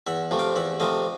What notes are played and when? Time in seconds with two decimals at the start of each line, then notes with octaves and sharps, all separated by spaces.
0.07 E2 E5 F#5
0.31 C3 F3 A3
0.39 F5 G5
0.56 E2 E5 F#5
0.80 C3 F3 A3 D#5 F5